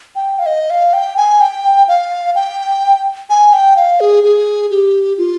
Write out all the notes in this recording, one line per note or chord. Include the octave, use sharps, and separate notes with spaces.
G5
F5
D#5
F5
G5
G#5
G5
F5
G5
G#5
G5
F5
G#4
G#4
G4
F4